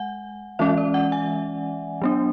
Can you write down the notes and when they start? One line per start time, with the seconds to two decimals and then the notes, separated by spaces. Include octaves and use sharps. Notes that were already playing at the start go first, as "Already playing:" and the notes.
Already playing: G#3 F#5 G#5
0.59 E3 G#3 C#4 E5
0.78 D5
0.94 F#5
1.12 G#5
2.02 F#3 B3 D4